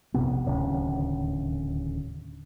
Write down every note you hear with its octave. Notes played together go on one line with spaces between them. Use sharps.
F1 A#1 C3 B3
D1 D#2 C#3